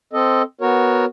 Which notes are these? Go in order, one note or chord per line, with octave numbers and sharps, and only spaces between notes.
C4 A4 D#5
B3 F#4 A#4 C#5